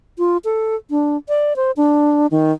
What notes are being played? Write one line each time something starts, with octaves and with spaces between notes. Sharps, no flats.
F4
A4
D4
D5
C5
D4
D#3